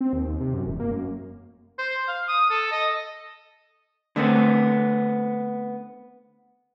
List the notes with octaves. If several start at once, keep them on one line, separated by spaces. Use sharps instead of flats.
C4
D#2
D#2
C3
F#2
E1
A#3
F#2
C5
F5
D#6
A4
D#5
D3 A3 B3 C4